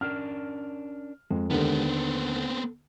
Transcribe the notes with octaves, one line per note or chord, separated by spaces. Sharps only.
C#4 D4 A#4 F6
F2 G#3
D#2 D3 G#3 B3 C4 G4 A#4
A4